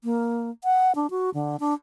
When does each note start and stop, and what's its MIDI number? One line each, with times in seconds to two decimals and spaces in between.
0.04 0.50 58
0.64 0.92 78
0.95 1.10 62
1.10 1.30 66
1.34 1.56 50
1.60 1.74 62